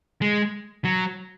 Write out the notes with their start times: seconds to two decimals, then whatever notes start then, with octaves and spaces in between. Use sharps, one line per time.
0.22 G#3
0.85 F#3